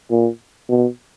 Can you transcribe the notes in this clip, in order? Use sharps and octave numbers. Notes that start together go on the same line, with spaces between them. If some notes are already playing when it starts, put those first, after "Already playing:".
A#2
B2